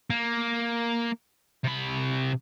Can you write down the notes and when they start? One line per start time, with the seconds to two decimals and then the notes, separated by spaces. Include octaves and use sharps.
0.10 A#3
1.64 C3 B5